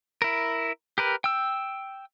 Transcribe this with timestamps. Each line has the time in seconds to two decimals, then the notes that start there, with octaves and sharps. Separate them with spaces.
0.22 E4 A#4
0.98 G4 A#4 B4
1.24 G5 E6